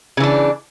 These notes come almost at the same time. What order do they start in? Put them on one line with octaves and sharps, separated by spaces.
C#3 E3 D4